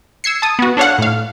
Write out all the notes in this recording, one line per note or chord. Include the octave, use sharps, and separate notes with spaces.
E6 G#6 C7 C#7
A5 D#6
B3 F#4
D4 A4 C#5 F5 F#5
A2 F5